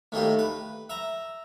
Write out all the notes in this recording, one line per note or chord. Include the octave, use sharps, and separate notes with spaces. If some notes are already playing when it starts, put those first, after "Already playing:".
A2 D#3 A#3 G4
B4
E5 A#5